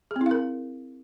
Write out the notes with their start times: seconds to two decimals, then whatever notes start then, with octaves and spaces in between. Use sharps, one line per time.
0.11 G#4
0.16 C4
0.21 E4
0.26 F5
0.31 A#4